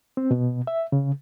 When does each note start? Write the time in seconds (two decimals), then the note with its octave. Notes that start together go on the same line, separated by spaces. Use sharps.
0.17 C4
0.31 B2
0.67 E5
0.92 C#3